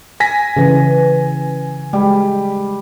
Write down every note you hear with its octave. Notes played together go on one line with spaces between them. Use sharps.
G#5 A#6 B6
C#3 E3
G3 G#3